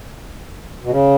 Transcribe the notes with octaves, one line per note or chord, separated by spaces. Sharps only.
B2
C#3